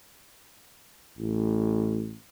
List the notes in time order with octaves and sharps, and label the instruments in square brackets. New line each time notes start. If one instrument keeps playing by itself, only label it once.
[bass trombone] A1